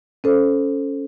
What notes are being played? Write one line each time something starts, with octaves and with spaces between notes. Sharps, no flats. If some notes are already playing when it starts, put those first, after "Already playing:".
C#4 A4 C5